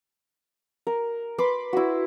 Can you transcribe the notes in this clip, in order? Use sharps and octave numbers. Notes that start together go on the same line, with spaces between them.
A#4
B4 B5 C6 D6
E4 F#4